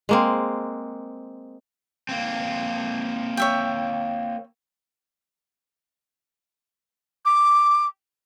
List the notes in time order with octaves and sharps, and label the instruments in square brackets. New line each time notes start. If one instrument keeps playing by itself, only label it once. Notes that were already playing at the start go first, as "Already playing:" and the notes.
[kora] G#3 A#3 C4
[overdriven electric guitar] A#3 C4
[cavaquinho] C#5 E5 G5
[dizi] D6